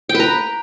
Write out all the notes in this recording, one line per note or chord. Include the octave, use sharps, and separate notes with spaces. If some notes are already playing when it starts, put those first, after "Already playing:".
G5
B4
A#5